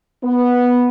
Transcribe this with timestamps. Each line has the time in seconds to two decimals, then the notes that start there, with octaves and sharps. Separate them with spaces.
0.24 B3